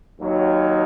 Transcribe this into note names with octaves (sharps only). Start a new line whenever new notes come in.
D#2 D#3 F#3